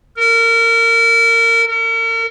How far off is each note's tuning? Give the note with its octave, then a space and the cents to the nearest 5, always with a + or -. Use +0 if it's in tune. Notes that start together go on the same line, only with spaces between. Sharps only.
A#4 -25
A#4 -40